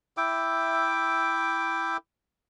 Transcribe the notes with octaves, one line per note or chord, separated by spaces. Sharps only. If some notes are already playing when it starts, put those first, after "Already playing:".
E4 E5 G5 D6